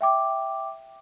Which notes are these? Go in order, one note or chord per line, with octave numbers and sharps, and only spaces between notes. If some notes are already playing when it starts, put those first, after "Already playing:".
E5 G5 D6